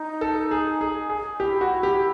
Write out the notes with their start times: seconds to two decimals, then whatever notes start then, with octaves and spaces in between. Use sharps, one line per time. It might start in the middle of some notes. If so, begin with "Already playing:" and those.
Already playing: D#4
0.21 A4
0.51 G#4
0.81 G#4
1.10 G#4
1.39 E4 G4
1.61 F#4
1.83 G4